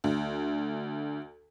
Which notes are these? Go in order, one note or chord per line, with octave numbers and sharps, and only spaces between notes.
D2